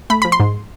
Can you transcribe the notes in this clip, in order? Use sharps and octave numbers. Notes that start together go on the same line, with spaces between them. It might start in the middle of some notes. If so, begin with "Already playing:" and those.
A3 B5
F3 B5
C6
G#2